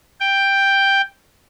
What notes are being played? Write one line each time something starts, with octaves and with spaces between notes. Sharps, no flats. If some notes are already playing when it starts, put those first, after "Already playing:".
G5